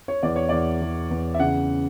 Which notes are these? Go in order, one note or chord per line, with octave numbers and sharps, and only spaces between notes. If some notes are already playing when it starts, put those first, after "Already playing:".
C#5
E2 D5
C#5
E2 D5
E2
E2
E5
C#3 F#5